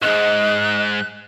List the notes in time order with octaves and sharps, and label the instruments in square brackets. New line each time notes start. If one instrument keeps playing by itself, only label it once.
[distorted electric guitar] B1 G#2 [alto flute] D#5 [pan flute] F#6